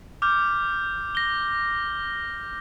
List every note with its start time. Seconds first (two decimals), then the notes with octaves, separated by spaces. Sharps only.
0.22 D6 F6 G6
1.15 A#6 G7